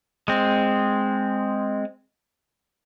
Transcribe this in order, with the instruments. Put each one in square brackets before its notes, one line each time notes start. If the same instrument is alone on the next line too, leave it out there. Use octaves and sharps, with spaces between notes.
[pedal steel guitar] G#3 C4